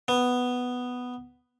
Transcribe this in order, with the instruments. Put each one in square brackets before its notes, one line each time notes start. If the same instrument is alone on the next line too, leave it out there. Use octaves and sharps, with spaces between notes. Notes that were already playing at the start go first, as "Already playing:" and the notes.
[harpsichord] B3